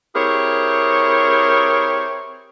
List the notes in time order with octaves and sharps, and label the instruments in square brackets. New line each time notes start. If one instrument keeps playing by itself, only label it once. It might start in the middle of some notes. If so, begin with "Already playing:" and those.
[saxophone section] C4 E4 G4 G#4 A#4 C#5